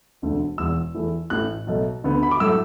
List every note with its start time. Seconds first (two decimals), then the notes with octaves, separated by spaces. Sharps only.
0.22 E1 D2 D3 A3
0.58 E1 E2 E3 E6
0.95 E2 E3 A3
1.30 A1 A2 E3 A3 F#6
1.67 B1 B2 A3
2.04 D2 D3 B3
2.23 B5
2.31 D6
2.40 A2 F#3 A3 E6